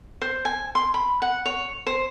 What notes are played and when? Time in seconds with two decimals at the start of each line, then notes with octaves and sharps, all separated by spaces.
0.22 C5
0.45 G#5
0.75 C6
0.94 B5
1.22 F#5
1.46 C#5
1.87 C5